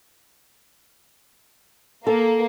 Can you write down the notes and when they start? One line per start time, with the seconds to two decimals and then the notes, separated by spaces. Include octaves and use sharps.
2.07 A#3 A4